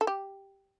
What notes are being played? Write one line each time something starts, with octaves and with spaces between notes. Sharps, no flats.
A4
G4